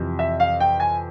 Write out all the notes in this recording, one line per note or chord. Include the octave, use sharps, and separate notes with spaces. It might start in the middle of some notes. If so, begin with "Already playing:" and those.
Already playing: F2 C3 E3
E5
F5
G5
G#5